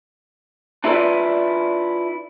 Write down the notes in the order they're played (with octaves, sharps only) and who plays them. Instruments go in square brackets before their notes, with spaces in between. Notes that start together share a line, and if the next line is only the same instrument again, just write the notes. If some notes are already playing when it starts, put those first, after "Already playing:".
[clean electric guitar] D4 E4 F4 A4 B4 D5